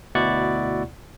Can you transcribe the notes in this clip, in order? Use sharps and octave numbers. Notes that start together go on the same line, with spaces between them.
D2 B2 E4 D5 F#5 C#6